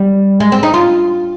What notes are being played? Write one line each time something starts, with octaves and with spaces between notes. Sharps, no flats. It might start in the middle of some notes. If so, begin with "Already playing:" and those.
Already playing: G3
G#3
C4
D#4
F4